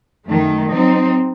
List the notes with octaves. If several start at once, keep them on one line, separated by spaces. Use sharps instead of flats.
F#2 D#3 A3
F#3 C4 D#4